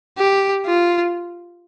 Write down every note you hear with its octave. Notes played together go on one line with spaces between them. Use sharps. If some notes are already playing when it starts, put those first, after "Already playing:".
G4
F4